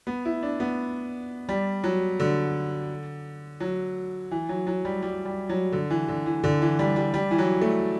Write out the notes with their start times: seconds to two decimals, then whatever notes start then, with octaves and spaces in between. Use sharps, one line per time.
0.07 B3
0.25 E4
0.43 D4
0.60 B3
1.49 G3
1.84 F#3
2.20 D3
3.60 F#3
4.31 E3
4.49 F#3
4.67 F#3
4.85 G3
5.02 G3
5.25 G3
5.49 F#3
5.72 D3
5.90 E3
6.08 D3
6.26 E3
6.44 D3
6.62 E3
6.79 G3
6.96 G3
7.14 G3
7.31 E3
7.38 F#3
7.61 A3